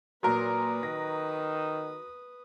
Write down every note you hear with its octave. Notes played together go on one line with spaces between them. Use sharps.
A#2 F#3 A#4 B4 C6 D#6
D#3 A#6